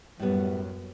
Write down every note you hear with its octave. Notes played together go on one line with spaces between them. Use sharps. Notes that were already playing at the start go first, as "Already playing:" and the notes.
F#2 A2 G3 B3